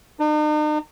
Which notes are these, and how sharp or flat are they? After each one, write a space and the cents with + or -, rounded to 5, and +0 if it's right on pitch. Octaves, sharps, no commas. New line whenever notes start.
D#4 -45